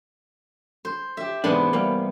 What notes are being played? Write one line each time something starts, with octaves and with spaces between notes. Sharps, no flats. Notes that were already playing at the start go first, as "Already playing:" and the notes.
C5
G4 E5
G#2 C3 E3 G#3 B3 D4
G3 A#3